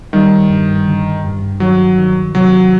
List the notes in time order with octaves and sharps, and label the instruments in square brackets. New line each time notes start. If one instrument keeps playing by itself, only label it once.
[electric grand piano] D#3 [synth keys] G3
[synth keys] G2
D3
G2
[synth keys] D#3 [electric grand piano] F#3
[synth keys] D#3
[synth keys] C3 [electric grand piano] F#3